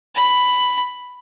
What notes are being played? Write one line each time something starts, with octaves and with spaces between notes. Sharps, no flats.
B5